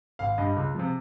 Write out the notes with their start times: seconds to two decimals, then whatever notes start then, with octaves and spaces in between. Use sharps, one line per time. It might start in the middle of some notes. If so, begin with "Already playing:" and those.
0.19 G#1 F5
0.38 G2 G3 D#5
0.56 C#2
0.75 C3 F3